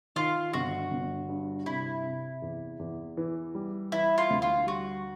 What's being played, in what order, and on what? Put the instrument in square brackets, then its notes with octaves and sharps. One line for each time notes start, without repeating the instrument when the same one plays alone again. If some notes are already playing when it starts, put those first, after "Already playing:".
[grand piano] D#3 [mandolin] F4
[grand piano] G1 [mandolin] F#4
[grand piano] G1
G2
[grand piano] C3 [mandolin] E4
[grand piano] C3
E2
E2
E3
G3
[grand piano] E3 [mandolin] E4
[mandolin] F4
[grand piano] D2
[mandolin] F4
[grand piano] G3 [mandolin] F#4